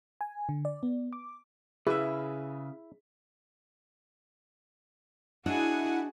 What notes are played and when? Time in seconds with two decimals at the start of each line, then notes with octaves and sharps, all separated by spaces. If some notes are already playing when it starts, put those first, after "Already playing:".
0.21 G#5
0.49 D3
0.65 D5
0.83 B3
1.13 D6
1.87 C#3 E4 G#4 B4 E5
5.46 D4 E4 F#4 G#4 D5 D#5 F#5